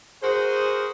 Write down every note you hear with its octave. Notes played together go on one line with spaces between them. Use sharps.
F#4 G#4 A#4 C5